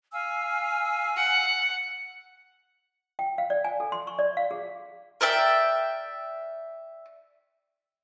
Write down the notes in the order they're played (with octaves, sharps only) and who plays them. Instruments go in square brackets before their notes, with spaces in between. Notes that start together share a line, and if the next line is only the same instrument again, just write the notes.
[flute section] F5 G#5 E6
[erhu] F#5
[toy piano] G5
F5
D5
G#5
A4
C6
C#6
D5
F5
G#4
[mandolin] A#4 D5 E5 G5